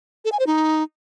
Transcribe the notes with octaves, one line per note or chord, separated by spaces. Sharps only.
A4
G#5
C5
D#4